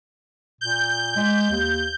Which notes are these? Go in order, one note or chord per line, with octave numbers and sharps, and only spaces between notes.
A#2 G6
G#3
D#2